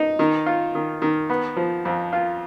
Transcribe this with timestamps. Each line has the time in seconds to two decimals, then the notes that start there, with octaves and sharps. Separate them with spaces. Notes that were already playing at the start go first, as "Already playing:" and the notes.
Already playing: D#4
0.19 D#3
0.46 F4
0.75 D#3
1.02 D#3
1.30 B3
1.57 F3
1.85 F2
2.13 F4